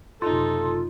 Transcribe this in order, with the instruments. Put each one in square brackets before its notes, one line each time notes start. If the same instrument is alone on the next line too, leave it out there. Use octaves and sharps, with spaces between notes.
[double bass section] F#1 C3 [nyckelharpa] D#4 [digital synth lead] F4 [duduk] A4